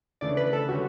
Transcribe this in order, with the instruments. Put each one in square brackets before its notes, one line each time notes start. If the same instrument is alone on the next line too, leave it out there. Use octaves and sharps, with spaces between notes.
[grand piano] C#3 E3 A3 D4 [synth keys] D5
[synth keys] B4
A4
[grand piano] D3 G3 C#4 G4 [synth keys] F#4